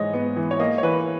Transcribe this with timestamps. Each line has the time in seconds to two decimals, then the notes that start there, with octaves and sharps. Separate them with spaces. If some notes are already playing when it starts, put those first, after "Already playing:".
Already playing: G#2 E3 G#3 C#5 D#5
0.13 B3
0.36 E3
0.51 C#5
0.59 A#3 D#5
0.78 C#5
0.83 E3 B4